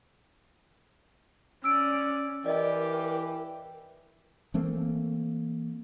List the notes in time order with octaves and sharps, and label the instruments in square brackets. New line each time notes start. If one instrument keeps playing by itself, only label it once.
[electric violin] C#4 D5 [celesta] E6 D7
[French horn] E3 [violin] G4 [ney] A#4 [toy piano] D5 D#5 G#5
[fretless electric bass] E3 A3 A#3 C4